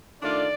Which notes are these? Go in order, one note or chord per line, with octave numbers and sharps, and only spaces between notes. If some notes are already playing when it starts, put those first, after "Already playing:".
D#3 A3 D4 F4 D5